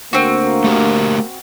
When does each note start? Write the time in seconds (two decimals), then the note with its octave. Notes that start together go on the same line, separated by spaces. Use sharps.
0.13 D2 A#3 C4 F#4
0.64 A3 G4 A#4